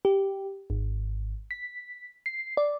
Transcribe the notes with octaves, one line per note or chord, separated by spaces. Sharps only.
G4
G#1
B6
C7
D5